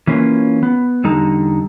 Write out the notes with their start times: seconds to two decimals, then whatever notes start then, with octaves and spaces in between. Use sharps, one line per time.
0.07 E3 A#3 C#4 F4
0.63 B3
1.04 E2 D3 G3 D#4 A4 A#5